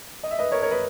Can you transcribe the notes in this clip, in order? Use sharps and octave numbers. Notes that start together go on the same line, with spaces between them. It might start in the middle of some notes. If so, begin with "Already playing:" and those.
D#5
E5
B4 D#5
A#4 C#5
A#4 C#5
B4 D#5